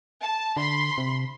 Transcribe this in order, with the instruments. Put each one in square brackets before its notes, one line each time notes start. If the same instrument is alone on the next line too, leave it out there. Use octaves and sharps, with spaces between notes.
[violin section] A5
[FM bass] D3 [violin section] B5 C6
[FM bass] C3